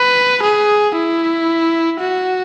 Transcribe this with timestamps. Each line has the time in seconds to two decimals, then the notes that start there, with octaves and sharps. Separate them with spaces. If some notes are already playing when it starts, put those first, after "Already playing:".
Already playing: B4
0.43 G#4
0.95 E4
2.00 F#4